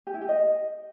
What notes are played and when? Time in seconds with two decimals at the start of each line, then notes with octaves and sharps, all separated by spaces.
0.07 G4
0.14 E4
0.21 G4
0.29 D#5